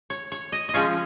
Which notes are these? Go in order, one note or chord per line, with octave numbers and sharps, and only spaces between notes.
C#5
C#5
D#5
D#5
F3 G#3 C#4 F4 C#5